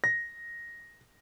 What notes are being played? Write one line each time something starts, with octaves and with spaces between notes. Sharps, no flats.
A#6